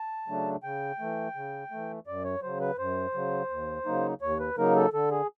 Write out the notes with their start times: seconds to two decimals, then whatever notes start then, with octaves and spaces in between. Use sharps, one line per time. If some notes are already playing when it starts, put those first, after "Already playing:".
Already playing: A5
0.28 C#3 F#3 A3 D4
0.63 C#3 G5
1.00 E3 A3
1.35 C#3
1.71 E3 A3
2.07 F#2 D5
2.24 C#5
2.42 C#3 F#3 C5
2.60 B4
2.78 F#2 C5
3.14 C#3 F#3
3.50 D#2
3.86 C#3 F#3 A#3 D#4
4.21 D#2 C#5
4.40 B4
4.57 C#3 F#3 A#3 D#4 A#4
4.76 A4
4.93 D3 A4
5.11 G#4